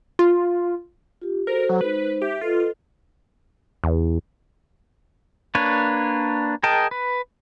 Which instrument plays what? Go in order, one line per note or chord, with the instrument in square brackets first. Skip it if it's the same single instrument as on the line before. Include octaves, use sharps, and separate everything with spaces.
[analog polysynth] F4
[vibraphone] F4 G4
[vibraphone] F#4 A4 C5 [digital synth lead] A#4
[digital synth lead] F#3
[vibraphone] G#3 D#4 C5 [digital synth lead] B4
[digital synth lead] G4 [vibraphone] E5
[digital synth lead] F4 [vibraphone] A4 B4 D#5
[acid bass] E2
[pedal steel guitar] A#3 D4 B4 C#5
G#4 A#4 D#5 G5 A5
B4